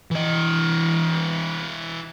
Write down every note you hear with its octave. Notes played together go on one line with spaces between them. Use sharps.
E3 D#5